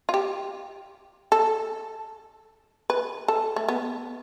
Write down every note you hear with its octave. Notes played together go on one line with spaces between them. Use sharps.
F4
G4
A4
B4
A4
A3
B3